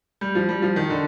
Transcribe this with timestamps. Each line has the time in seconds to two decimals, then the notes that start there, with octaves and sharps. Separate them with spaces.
0.21 G3
0.35 F3
0.49 G3
0.62 F3
0.76 D#3
0.90 D3